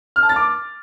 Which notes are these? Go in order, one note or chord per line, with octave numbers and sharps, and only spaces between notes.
F6
A5
A6
D6